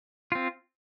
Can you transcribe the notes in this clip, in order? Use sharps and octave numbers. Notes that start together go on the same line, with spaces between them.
C4 F4